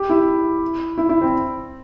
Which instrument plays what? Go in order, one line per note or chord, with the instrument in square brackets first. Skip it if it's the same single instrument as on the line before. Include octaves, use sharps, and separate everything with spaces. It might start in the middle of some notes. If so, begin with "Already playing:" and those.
Already playing: [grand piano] G4
E4
E4
E4
C4